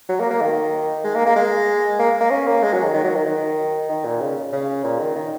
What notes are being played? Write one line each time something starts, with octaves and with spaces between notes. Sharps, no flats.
F#3
A#3
A#3
D#3
G#3
A#3
A#3
G#3
A#3
A#3
C#4
A#3
G#3
F#3
D#3
D#3
F#3
D#3
D#3
D#3
A#2
C#3
C#3
A#2
D#3
D#3